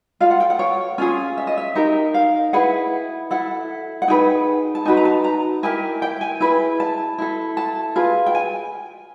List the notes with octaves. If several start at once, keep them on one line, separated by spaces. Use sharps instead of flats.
F4 A4 F5
F#5
G5
F#5
C#5
C#4 F4 G#4
E5
D#5
E5
D#4 G4 A#4
F5
E4 G#4 B4 F#5
E4 A4 F#5
F#5
D#4 G#4 B4 G5
A5
D#4 F#4 B4 G#5
A#5
A5
A#5
E4 G4 A#4 G#5
G5
G#5
E4 G#4 B4
A5
E4 A4
A5
F4 G#4 B4
G5
G#5